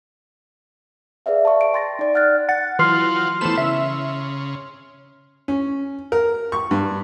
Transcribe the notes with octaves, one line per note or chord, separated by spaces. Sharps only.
G#4 B4 D5 E5 F5
A5 C#6
D7
G5 C6 A6 A#6
D#4 D5
D5 F#5 F6 F#6 A6
F#5 A6
E3 F#3 F4 C6 F6 C7
E3 A3 B3 C5 E7
C#3 E5
C#4
A#4
C#6
G2